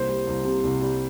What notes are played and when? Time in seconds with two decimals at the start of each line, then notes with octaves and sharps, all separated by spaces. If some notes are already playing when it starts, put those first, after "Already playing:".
Already playing: C2 A#3 C5
0.09 G3
0.27 C2
0.45 C3
0.64 C2
0.81 G3